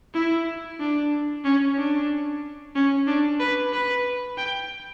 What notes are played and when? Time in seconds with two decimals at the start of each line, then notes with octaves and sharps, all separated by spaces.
0.14 E4
0.80 D4
1.44 C#4
1.77 D4
2.75 C#4
3.07 D4
3.40 B4
3.73 B4
4.38 G5